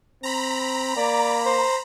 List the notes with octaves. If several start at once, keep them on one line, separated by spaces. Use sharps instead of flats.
C4 A#5 B5
A#3 D5
C5